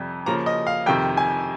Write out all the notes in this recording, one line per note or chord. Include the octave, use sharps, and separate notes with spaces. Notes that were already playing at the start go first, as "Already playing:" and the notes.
Already playing: F2 C3 G3
C#3 F3 A#3 A#5
D#5
F5
F2 C3 D#3 G5
G#5